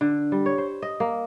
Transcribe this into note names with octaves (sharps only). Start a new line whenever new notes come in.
D3
G3
C#5
C5
D#5
A#3